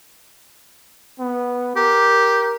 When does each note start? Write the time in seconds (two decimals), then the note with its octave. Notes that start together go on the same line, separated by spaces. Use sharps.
1.19 B3
1.76 G4 A#4